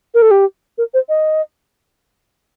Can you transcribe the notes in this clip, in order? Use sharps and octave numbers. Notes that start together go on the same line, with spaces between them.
A#4
A4
G4
A#4
C5
D#5